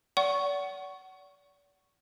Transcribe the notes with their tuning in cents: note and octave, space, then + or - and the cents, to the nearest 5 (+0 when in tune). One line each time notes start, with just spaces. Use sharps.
D5 -40 F#5 +25 C#6 +0